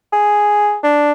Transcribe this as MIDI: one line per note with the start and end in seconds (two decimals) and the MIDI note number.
0.12 0.77 68
0.84 1.12 62